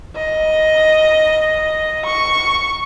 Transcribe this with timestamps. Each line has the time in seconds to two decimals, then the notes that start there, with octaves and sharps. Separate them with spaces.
0.16 D#5
2.06 C#6